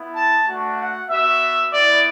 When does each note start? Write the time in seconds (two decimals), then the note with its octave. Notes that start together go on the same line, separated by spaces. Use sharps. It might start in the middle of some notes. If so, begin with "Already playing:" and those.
Already playing: B3 E4
0.16 A5
0.47 A3 D4 F#4
0.78 F#5
1.10 B3 F#4 E5
1.72 B3 E4 D5